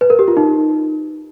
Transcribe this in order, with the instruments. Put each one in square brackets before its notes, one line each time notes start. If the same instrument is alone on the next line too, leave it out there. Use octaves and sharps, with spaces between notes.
[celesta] B4
A#4
G4
F4
D#4